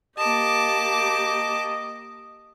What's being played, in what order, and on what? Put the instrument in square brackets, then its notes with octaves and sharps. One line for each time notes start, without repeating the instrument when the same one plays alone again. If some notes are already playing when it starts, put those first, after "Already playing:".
[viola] A#3 G4 [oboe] D#5 [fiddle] A5 D6